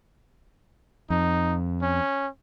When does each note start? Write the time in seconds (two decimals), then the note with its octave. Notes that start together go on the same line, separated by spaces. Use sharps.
1.10 F2 D#4
1.82 C#4